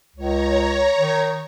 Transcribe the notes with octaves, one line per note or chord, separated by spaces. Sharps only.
C#2 C#5 A#5
D#3